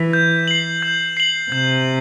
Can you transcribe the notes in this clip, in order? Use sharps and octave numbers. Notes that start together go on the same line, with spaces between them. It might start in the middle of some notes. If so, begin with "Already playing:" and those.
Already playing: E3
G6
C7 F#7
G6
C7 F#7
C3 G6